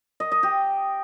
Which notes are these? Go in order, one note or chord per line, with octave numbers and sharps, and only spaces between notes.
D#5
D#5
G4